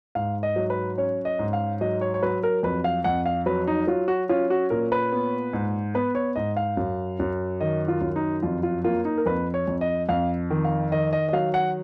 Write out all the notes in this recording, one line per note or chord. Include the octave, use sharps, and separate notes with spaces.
G#2 F5
D#5
F#3
B4
C#4 C#5
D#5
G#2
F5
F#3 D#5
C#5
C#5
F#3 B4
A#4
F2 B4
F5
F2 F#5
F5
F#3 B4
D#4
F#3 F4
F#4
C#4 F4
F#4
A#2 A#4
B4
B3
G#2
B3 B4
C#5
G#2 D#5
F5
F#2
F#2
D#3 D#5
F4
F#2
D#4
F2 F4
F4
A#3 F4
D#4
A#4
F2 B4
C#5
F2
D#5
F2 F5
D#3
F5
D#3 D#5
D#5
D#5
F#3 F5
F#5